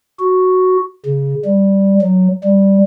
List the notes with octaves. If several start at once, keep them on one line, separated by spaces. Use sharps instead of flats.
F#4
C#3
G3
F#3
G3